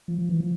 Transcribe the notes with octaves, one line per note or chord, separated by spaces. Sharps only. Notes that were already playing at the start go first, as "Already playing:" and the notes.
F3
F3
E3
F3